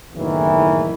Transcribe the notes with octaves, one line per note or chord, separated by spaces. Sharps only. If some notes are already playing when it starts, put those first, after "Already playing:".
F#1 E2 A2 D#3 E3